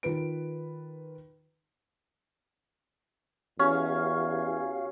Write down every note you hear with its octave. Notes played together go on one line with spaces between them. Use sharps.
D#3 F4 B4 D7
E2 C#4 F#4 G4 F5